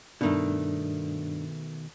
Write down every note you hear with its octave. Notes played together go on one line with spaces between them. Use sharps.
G2 B2 D#3 A3 D4